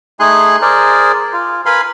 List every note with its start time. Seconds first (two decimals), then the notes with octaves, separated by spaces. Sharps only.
0.20 A3 D#4 G#4 G#5 C6 F#6
0.62 G#4 A#4 C5 D5
1.33 F4
1.66 A#4 B4 F5 G#5 B5 C6